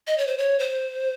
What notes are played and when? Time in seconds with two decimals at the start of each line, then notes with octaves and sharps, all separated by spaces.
0.07 D#5
0.18 C#5
0.27 C5
0.38 C#5
0.59 C5